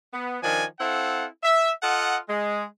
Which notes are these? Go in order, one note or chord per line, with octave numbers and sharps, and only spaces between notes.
B3
D#3 F3 D4 D5 G#5
C4 E4 A4 F5 F#5
E5
F4 A4 D#5 F#5
G#3